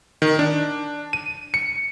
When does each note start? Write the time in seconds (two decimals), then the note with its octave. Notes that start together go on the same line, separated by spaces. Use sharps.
0.22 D#3
0.39 D4
1.13 D#7
1.54 C#7